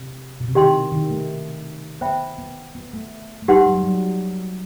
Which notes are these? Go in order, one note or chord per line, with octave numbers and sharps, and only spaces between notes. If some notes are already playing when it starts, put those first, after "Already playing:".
Already playing: C3
B2
C3
D#3 E4 G4 D#5 G5 C6
D#3
A3
B3 C5 E5 G5 B5
B3
B3
A3
A3
G3 D#4 G4 B4 F#5 C6
F#3
G3
F#3